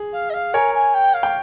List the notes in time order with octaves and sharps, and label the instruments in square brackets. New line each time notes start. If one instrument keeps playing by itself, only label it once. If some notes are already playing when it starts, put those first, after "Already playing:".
Already playing: [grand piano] G#4
[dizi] F5
D#5
F5
[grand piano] A#4 C#5 [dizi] G#5
[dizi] G#5
G5
F5
[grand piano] G5